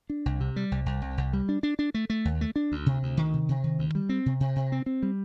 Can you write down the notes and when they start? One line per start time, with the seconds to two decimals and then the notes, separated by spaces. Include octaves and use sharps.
0.10 D4
0.26 C2
0.40 C3
0.56 G3
0.72 C2
0.86 C2
1.02 C2
1.18 C2
1.33 G3
1.49 D4
1.63 D4
1.79 D4
1.94 A3
2.10 A3
2.25 D#2
2.41 A3
2.56 D4
2.72 D2
2.86 C3
3.03 D2
3.17 D#3
3.33 C3
3.49 C3
3.64 D#3
3.79 D2
3.95 G3
4.09 C4
4.26 C3
4.40 C3
4.56 C3
4.72 C4
4.86 C4
5.03 G3